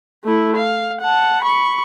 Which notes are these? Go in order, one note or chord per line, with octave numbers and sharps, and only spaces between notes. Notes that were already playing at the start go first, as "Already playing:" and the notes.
A3 E4
F5
F#5 A5
B5 C#6